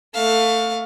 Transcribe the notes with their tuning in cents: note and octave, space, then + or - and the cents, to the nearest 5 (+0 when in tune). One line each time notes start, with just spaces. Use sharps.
A3 +25 F5 +20